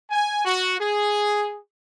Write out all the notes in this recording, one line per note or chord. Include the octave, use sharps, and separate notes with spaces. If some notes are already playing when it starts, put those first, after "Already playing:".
G#5
F#4
G#4